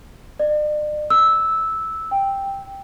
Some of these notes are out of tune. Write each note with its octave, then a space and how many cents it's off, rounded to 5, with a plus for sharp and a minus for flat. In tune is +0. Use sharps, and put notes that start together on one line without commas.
D5 +40
E6 -10
G5 +5